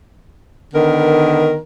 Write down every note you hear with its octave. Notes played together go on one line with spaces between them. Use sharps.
D3 D#3 B3 A#4